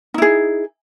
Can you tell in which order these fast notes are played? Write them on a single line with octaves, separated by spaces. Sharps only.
D#4 E4 G#4